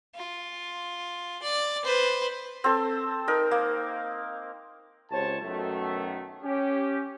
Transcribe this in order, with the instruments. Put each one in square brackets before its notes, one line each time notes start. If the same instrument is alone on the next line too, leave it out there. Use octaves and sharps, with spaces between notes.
[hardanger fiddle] F4
D5
B4 C5
[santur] C4 A4
D#4 A#4
A#3
[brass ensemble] C#2 C3 C5 C#5 A5
F#2 B2 D#3 A3
C#4 G4